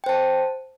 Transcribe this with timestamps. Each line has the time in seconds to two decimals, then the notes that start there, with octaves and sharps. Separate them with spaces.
0.04 G5
0.06 C5
0.09 A5